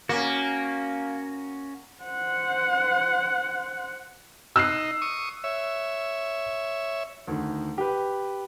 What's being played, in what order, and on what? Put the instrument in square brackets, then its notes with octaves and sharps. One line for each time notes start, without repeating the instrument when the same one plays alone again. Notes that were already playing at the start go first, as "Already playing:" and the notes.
[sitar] A#3 [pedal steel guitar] C#4 F#4
[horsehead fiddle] C5 F#5
[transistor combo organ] D#4 [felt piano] E6 F#6 C7
[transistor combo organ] C#6 D#6
C#5 E5
[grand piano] D2 D#3
G4 B4